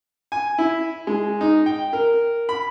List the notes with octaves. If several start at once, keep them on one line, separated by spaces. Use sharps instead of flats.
G#5
E4
G#3
D#4
G5
A#4
B5